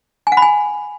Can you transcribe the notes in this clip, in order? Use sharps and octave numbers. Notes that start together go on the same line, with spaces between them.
G#5
F#5
B5
G#5